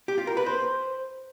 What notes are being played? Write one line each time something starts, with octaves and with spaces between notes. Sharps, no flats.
G4
F4
A#4
B4
C5